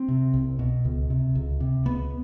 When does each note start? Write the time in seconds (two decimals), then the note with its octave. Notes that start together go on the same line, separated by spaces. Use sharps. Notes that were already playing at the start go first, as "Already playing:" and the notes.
Already playing: C4
0.08 C3
0.34 C2
0.59 B2
0.85 C#2
1.10 C3
1.35 C#2
1.60 C3
1.86 C#2 B3